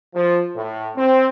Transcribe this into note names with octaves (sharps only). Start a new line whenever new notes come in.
F3
A2
C4